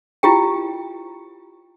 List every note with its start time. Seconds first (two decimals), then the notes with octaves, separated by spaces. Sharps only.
0.23 E4 F4 G4 G5